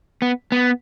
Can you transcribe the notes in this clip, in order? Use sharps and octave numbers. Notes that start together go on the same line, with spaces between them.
B3
B3